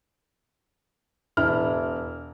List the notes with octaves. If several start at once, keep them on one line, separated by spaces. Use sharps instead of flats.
E1 E4 F6